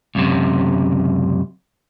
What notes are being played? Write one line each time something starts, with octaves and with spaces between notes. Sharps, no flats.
C#2 F#2 C3